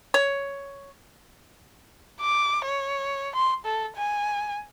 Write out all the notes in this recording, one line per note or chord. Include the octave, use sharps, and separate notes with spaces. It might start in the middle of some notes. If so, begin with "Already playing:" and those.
C#5
D6
C#5
C6
A4
G#5